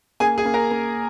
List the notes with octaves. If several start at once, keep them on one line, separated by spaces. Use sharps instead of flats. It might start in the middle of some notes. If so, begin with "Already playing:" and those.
A#3 G#4 G#5
G#4 G#5
A#3
A#4 A#5
A#3